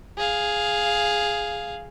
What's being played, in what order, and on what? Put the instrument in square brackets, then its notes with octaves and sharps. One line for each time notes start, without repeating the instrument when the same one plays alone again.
[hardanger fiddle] G#4 F5